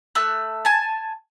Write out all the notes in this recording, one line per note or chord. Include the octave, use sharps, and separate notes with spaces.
A3 E5 F#6
G#5 A5